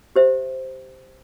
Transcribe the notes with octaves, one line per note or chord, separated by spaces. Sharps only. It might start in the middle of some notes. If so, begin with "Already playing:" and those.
G4 C5 E5